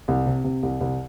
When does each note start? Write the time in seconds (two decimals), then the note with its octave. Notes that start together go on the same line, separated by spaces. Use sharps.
0.08 C2
0.26 C3
0.44 C3
0.63 C2
0.81 C2